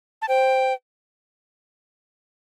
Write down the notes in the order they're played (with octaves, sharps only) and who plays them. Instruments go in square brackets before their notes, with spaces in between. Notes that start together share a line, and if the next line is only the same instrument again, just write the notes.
[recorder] A5
[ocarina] C5 [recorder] G5